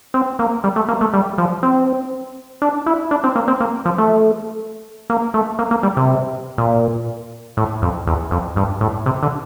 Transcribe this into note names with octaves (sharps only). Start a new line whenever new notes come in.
C4
A#3
G3
A3
A#3
A3
G3
F3
C4
D4
E4
D4
C4
A#3
C4
A#3
F3
A3
A#3
A3
A#3
A#3
G3
C3
A#2
A2
F2
E2
F2
G2
A2
C3
D3